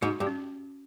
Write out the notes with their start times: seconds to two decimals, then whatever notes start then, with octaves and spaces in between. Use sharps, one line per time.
0.02 G#2 F#4
0.20 G2
0.27 C#4